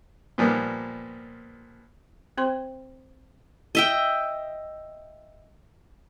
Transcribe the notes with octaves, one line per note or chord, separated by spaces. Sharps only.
A#2 F3 G3 A#3 B3
C4 C5 C6
D#5 E5 G5